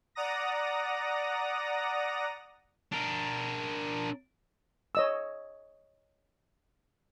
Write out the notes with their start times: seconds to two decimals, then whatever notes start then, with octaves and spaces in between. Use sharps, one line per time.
0.15 D5 F#5 A#5 D#6 A#6
2.92 D4 A#4
4.95 C#5 D#5 E6